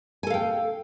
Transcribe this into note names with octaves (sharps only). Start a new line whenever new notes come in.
A4 F5 G5 G#5